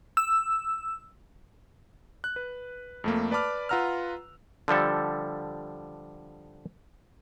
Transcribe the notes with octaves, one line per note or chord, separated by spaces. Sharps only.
E6
F#6
B4
F2 A3 A#3
B4 D5 A5 B5 D6 F6
F4 B4 F#5 A#5 E6 F6
D3 F3 G3 A4